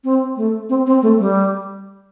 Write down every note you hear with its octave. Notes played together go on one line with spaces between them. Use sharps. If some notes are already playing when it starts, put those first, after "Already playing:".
C4
A3
C4
C4
A3
G3